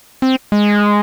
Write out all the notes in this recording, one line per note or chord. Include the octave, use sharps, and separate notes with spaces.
C4
G#3